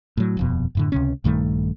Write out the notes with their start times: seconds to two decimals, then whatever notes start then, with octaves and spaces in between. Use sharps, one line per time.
0.17 A2 F#3
0.37 D#1 F2 B2
0.75 F#2 A2 D3
0.92 C#2 C3 C#4
1.24 A#1 G2 D#3 A3